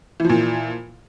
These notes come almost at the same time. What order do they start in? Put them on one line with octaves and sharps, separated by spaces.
E3 F3 A#2